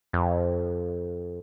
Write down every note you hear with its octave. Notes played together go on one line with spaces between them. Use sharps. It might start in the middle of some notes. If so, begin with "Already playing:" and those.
F2